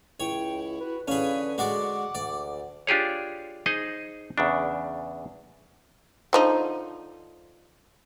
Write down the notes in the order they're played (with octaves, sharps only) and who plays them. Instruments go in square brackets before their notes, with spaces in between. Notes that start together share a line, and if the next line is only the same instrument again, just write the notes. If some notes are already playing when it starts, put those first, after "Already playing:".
[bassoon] C#2 [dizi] E4 [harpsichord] C#5 [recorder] G5
[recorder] F#4 [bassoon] B4
[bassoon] D3 [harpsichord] C#4 G#4 [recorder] B4 [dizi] F5
[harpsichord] G#3 F#4 D5 [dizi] F#5 [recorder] D6
[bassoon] D2 [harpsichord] D5
[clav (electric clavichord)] D4 F4 G4 G#4 C#5
D#4 G#4 C5 D#5
E2 C#3 D4
[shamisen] D3 F3 D#4